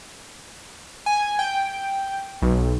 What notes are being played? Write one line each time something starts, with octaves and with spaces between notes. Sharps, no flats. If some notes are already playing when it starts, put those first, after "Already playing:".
G#5
G5
B1